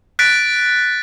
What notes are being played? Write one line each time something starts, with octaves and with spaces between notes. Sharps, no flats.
F#6 A6 B6 D7